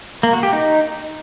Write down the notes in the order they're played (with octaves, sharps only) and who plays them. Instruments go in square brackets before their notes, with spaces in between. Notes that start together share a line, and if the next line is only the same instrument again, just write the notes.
[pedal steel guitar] A#3
F#4
G4
D#4